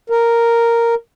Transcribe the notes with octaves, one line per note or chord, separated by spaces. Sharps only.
A#4